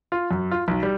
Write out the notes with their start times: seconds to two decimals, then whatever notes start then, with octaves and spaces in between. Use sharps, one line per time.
0.12 F4
0.31 F#2
0.51 F4
0.68 B1
0.83 G3